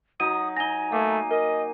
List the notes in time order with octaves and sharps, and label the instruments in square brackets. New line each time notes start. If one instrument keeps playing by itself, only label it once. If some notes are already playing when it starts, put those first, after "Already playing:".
[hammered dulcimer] F#3 D#4 [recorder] D#6 [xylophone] D#7
[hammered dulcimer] D#4 A#5 [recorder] G#5 [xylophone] A#6 G7
[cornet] A3 [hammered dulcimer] A#3
[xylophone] A#4 [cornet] D#5